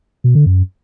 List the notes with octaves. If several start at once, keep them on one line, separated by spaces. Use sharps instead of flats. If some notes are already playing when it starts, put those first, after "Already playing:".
B2
D3
F#2